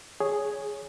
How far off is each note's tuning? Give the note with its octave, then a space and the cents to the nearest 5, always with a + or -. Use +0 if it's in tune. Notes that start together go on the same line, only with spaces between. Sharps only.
G#4 +0 C#5 +0